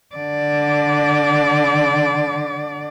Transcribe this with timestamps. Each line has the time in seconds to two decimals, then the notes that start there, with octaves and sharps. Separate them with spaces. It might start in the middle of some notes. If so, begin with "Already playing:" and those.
0.16 D3 D5